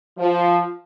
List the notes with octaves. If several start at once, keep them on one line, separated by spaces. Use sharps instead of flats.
F3